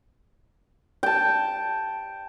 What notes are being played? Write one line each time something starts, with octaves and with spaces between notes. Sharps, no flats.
G5 A5